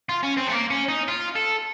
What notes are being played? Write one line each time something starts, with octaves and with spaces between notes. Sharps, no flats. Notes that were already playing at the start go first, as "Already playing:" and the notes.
F4
C#4
C4
A3
A#3
C#4
D#4
F4
A4